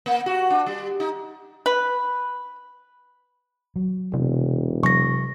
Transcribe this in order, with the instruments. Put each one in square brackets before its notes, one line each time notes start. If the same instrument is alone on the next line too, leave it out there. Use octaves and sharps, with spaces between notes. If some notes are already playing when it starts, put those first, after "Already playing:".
[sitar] A#3
F#4
D4
G3
D#4
[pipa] B4
[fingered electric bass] F#3
[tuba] E1 [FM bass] C3
[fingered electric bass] C3 [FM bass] F#3 [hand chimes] C#6 A#6